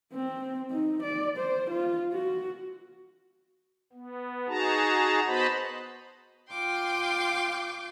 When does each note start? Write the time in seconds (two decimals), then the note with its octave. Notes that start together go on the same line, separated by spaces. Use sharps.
0.13 C4
0.71 D#4
1.02 D5
1.37 C5
1.70 F4
2.13 F#4
3.93 B3
4.48 D#4 F#4 G#4 A5 A#5
5.27 B3 F#4 C5 D#5 A5 B5
6.50 F4 G5 C6 D6